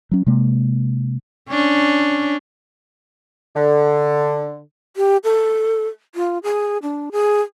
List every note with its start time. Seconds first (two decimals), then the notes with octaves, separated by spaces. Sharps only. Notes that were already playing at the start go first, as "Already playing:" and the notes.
0.11 F#3 C#4
0.27 C3 G#3 A#3
1.49 C#4 D4
3.55 D3
4.97 G4
5.24 A4
6.15 F4
6.43 G#4
6.83 D4
7.12 G#4